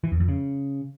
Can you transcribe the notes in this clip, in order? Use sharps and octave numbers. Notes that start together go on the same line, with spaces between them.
E3
E2
F2
C#3